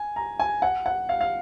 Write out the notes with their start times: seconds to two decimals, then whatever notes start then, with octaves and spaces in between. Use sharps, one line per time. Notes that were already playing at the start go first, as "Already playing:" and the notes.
Already playing: G#5
0.16 A#5
0.39 G#5
0.62 F#5
0.86 F#5
1.09 F5
1.21 F5